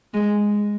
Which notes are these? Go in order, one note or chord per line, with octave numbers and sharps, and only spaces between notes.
G#3